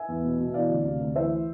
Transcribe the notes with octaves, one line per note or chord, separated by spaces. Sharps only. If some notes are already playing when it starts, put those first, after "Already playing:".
Already playing: E5 G#5
E2
B2
B2
E3 D5 F5
D2
C3
D2
E3 C5 E5